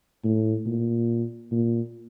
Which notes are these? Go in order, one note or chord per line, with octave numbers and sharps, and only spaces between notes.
A2
A#2
A#2